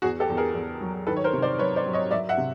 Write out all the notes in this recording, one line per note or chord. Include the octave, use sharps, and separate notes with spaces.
E2 F#4 G#4
G4 A4
E2
G#4 A#4
E2
F#3
D#3 A4 B4
C#5
A#4 C5
C3
C5 D5
F#3 B4 C#5
C5 D5
F#3
C#5 D#5
F#3 D5 E5
E5 F#5
C3